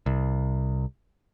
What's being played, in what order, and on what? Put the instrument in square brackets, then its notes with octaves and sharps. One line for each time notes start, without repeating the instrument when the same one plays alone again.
[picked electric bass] C2